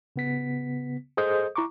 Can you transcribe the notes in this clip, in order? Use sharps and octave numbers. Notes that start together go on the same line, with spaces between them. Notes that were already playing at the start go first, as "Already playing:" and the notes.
C#3 B3 B6
G#4 A4 C5 D#5 D#6 G6
E4 A#5 C#6 D6